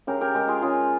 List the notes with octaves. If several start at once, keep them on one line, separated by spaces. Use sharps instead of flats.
C#3 G4 A#4
G4 A#4
G#3 G4 A#4
F4 G#4
C#3 F4 G#4